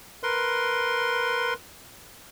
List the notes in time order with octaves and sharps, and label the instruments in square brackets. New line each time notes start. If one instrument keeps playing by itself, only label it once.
[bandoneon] A#4 B4 C6